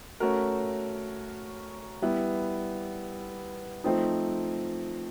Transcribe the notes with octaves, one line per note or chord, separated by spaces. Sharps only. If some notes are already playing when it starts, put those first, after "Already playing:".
A3 C#4 F#4 A#4
G3 B3 E4
F3 A3 C4 D#4